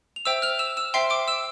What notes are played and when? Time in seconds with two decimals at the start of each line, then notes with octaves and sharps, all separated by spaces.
0.16 F7
0.25 C5 E5 G5 E6 E7
0.42 F6 F7
0.59 E6 E7
0.77 E6 E7
0.94 C5 E5 G5 C6 C7
1.10 D6 D7
1.28 E6 E7